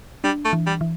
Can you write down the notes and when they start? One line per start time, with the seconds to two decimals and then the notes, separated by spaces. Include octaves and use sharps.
0.24 G3 D4
0.45 A3
0.53 E3
0.66 G3
0.81 E3